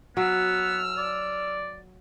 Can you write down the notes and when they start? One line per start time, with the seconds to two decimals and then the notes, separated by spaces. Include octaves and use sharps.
0.17 F#3 B3 E6 F6
0.98 D5